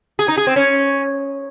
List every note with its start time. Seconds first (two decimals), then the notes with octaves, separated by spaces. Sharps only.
0.19 G#4
0.28 D#4
0.37 G#4
0.47 C4
0.56 C#4